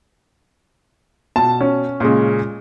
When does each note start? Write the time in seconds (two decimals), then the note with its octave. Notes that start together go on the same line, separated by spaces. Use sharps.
1.36 B2 A5
1.61 C#4
2.00 A#2 C#3 G#3